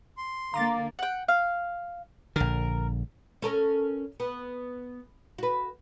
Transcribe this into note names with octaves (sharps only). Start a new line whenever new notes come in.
C6
D3 A#3 F5 A#5 D6 A6
F#5 G5
F5
A#1 D3 A#4
C#4 A4 A#4
B3
F#4 B4